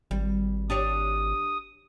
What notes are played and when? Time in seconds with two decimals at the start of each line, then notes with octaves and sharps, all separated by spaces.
0.11 G#1 G3
0.70 D4 G4 C#5 D#6